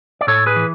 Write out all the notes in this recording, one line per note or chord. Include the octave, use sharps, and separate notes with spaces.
D5
A2 A4 C#5
G#4 B4
E3